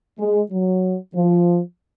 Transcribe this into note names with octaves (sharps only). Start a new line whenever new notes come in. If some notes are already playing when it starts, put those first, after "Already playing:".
G#3
F#3
F3